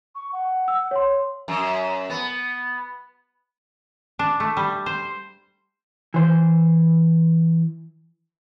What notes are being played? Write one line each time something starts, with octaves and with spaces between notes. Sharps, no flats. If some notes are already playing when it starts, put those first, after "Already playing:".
C#6
F#5
E6
C#5 C6
F#2
B3
D4
A3
G3
C5
E3 C5